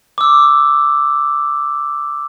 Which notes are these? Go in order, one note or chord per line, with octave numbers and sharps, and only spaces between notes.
D6 E6